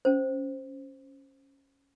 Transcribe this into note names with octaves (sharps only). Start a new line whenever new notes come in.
C#4 C5